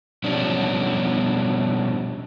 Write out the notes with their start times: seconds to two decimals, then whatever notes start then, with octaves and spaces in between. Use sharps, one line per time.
0.24 B2 F3 G3 B3 C#4 D4